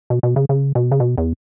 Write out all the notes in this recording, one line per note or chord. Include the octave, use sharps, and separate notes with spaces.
B2
B2
C#3
C#3
B2
C#3
B2
E2